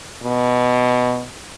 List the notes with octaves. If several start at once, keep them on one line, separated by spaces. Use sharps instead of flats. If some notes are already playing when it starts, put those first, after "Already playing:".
B2